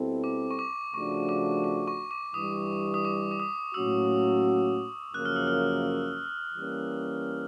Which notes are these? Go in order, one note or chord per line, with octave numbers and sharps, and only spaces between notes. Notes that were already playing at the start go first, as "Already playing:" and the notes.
Already playing: B2 G3 C4 E4 A4
D6
C#6
D6
C#3 F3 A3 D4 F#4 C#6
D6
D6
C#6
D6
G2 E3 G3 D#6
D#6
D6
D6
D#6
A2 F#3 A#3 C#4 F#4 E6
F#2 C#3 F3 A#3 C#4 F#6
F6
E6
F6
E3 G3 A#3 C#4